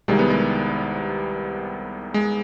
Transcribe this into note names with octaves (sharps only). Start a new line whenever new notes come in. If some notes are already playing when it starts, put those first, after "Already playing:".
C2 C3 D#3 G3 G#3
B3
G#3
G#3